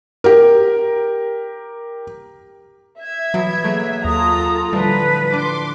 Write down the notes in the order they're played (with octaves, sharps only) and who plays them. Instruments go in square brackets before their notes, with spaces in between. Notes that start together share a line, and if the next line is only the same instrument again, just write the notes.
[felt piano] G4 A#4
[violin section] E5 [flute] G#6
[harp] B2 E3 [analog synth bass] F#3
[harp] F#3 A#3 G#4 [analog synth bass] A3
[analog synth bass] D#2 [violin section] F4 A4 A#5 [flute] D#6
[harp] A2 D3 F3 [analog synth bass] G3 [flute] B4
[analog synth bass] D4 [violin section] C6 D6